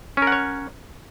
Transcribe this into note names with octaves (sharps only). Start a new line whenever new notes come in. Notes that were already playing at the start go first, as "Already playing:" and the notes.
C#4 A#4 C#5 F#5